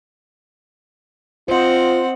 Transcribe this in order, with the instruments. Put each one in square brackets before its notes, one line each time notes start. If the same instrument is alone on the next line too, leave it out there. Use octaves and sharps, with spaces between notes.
[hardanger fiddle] C4 F#5 [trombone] F4 [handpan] C5 D#5